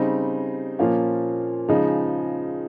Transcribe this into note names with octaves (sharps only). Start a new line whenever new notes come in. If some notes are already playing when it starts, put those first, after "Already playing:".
Already playing: C#3 G3 C4 D#4
A#2 F3 A#3 C#4 F4
C#3 F3 G#3 D#4